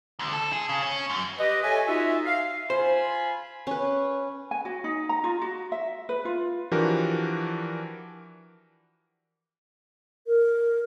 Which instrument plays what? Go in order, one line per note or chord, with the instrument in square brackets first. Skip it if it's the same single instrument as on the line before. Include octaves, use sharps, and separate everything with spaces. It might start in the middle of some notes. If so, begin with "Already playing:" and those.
[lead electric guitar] D2
A4
G#4
C#3
C#4
F#2
[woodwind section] G4 B4 D#5
A4 C#5 E5 G#5
D#4 F4 F#4 D#5 E5
F5
[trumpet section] F4 G#5 B5 [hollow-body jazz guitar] C5
[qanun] C#4 B4
[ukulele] G#5
F#4
D#4
A#5
F4
F#4
E5
B4
F4
[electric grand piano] E3 F3 D4 F#4 G4 A#4
[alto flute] A#4